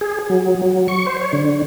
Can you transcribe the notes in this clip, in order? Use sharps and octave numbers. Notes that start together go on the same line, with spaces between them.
G#4
F#3
F#3
C#6
C5
C#5
D3